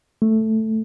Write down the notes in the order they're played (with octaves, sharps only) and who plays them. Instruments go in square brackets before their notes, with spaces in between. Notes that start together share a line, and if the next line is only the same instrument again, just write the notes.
[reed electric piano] A3